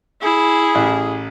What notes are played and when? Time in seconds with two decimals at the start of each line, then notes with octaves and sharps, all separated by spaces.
0.22 E4 G#4
0.75 A1